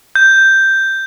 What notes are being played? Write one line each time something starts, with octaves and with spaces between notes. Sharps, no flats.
G6